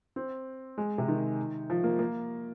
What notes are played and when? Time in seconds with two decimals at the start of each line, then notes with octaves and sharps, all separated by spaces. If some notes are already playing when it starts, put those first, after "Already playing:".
0.16 C4
0.78 G#3
0.98 C3
1.08 D#3
1.70 F3
1.84 A#3
1.99 A#3